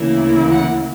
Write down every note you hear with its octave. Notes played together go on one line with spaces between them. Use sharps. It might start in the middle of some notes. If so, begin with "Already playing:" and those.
Already playing: D2 C#3 E3 A#3 E4
F#5